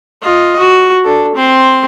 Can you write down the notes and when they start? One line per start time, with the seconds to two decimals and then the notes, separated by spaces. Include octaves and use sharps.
0.22 F4 D#5
0.59 F#4
1.04 D4 A4
1.35 C4 C6